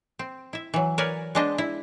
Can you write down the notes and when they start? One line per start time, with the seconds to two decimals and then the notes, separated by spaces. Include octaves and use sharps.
0.19 C4
0.53 E4 E5
0.74 E3 F#3
0.98 A#4 B4 C#5 D5 G#5
1.35 G#3 B3 D4 C5 D#5
1.58 E4